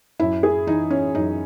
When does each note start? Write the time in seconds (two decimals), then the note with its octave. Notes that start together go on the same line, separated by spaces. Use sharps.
0.20 F#2 E4
0.43 G#4
0.67 E3 D#4
0.90 C#4
1.15 F#2 D#4